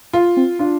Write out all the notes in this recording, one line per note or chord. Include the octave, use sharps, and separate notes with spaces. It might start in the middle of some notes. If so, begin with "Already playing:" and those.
F4
C4
D4 F4